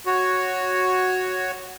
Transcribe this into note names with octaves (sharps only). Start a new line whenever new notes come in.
F#4 C#5